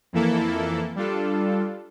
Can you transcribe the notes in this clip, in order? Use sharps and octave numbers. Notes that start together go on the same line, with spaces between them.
F2 E3 A#3 E4 A4
G3 D4 F4 A4